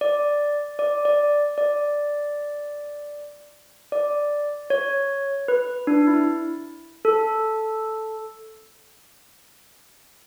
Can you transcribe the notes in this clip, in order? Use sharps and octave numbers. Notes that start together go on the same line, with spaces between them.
D5
D5
D5
D5
D5
C#5
B4
D4
E4
A4